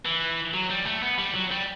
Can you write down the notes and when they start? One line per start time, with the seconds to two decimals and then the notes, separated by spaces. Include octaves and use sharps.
0.05 E3
0.54 F#3
0.70 G3
0.86 A3
1.02 B3
1.19 G3
1.35 F#3
1.51 G3